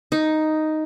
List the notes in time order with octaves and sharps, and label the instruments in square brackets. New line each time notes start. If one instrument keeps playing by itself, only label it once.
[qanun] D#4